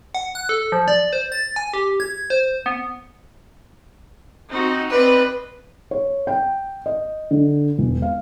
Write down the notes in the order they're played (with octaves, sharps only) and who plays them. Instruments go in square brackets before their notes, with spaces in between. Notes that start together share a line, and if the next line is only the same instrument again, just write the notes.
[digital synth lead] F#5
F#6
A4
F3
D5
C5
A6
G#5
G4
G#6
C5
B3
[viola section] C4 D#4 F#4
[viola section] C4 D5 D#5 [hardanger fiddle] B4
[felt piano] C#5
G5
D#5
D3
E1
F5